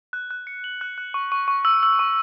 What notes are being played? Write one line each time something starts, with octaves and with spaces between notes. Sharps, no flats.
F#6
F#6
C#7
F#7
F#6
F#6
C#6
C#6
C#6
E6
E6
C#6